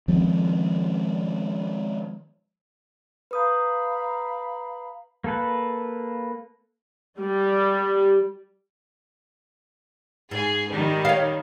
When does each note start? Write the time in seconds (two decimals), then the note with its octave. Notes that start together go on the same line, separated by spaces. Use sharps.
0.08 D#3 F3 G#3 C4
3.31 B4 F5 A#5 B5 D#6 G6
5.24 A#3 A4 B4
7.19 G3
10.31 G#2 G#4
10.69 D#3 G3
11.05 C#5 F5